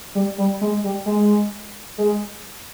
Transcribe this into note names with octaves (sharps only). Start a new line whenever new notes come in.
G3
G3
G#3
G3
G#3
G#3